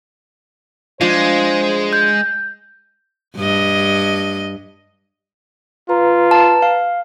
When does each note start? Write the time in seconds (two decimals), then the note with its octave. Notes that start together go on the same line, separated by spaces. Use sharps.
1.01 F3 G#3 D4 F4 C5
1.93 G6
3.37 G2 D#5
5.89 F4 B4 A#5
6.31 A5
6.62 F5